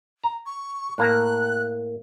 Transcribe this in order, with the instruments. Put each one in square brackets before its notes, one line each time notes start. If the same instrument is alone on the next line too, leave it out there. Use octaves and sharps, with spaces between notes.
[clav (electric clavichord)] A#5
[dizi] C#6
[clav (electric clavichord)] A2 A#3 A#5 [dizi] F#6